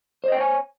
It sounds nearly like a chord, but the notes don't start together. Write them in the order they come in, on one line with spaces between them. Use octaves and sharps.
C5 D#5 G5 C#5 G#5